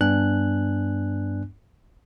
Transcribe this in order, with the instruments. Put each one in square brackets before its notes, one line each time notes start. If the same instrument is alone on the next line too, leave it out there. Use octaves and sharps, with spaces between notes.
[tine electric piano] G2 B3 D4 G#5 F#6